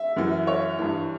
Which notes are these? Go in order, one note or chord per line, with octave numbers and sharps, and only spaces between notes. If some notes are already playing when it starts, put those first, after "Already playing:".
Already playing: E5
F#2 E3
C#5
G2 E3